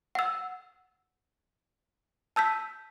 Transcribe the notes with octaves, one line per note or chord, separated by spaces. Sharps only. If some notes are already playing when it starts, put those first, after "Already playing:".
F#5 E6
A5 E6 G6 B6